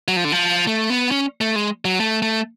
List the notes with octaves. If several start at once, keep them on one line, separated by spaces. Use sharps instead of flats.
F#3
F3
D3
F3
A3
B3
C#4
A3
G#3
F#3
A3
A3